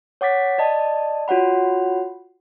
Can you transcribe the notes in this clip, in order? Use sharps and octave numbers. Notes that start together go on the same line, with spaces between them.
C#5 F#5 D6 A6 B6
D5 D#5 A5
F4 F#4 C#5 F#5 B5